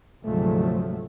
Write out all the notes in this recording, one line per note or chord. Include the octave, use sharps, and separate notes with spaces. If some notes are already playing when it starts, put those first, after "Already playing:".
D2 G#2 C3 F3 F#3 A3